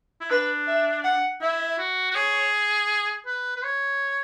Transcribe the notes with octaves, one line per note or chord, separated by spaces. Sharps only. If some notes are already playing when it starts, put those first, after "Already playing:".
E4
D4 B4
E5
F#5
E4 E5
F#4
F#4
G#4 C#5
B4
B4
C#5